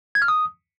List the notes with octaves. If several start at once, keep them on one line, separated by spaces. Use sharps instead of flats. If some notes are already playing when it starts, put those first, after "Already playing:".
G#6
F6
D#6